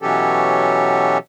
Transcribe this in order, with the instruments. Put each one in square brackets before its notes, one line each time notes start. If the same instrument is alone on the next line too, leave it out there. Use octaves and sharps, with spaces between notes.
[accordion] B2 E3 F#3 C#4 G4 A4